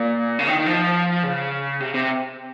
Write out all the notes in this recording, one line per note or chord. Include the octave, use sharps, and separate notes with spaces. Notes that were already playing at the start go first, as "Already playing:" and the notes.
Already playing: A#2
C#3
D#3
D#3
F3
C#3
C3
C3